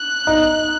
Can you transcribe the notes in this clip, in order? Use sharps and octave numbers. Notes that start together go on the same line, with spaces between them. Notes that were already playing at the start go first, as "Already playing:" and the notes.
Already playing: F#6
D#4